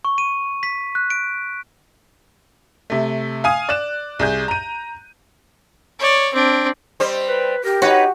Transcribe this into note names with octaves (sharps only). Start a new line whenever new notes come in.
C#6
D#7
B6
F#6
D7
C3 A3
F5 G#5 D#6
D5 F#6 E7
C2 G#4 G6
A#5 D#7
C#5 D5
C4 D4
G3 C4 C5
B4
G4 A#4
D#4 F#4 B4 C#5